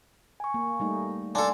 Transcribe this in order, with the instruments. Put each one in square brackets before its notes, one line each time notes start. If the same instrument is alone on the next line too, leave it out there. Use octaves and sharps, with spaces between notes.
[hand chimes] G#5 C#6
[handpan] A#3
G3 A3 D#4
[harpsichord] D4 A4 [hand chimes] F5 G#5 C6